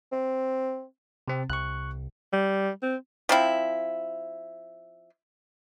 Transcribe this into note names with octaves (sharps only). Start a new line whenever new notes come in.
C4
C3 C4
C2 C#6 F#6
G3
C4
F3 C4 E4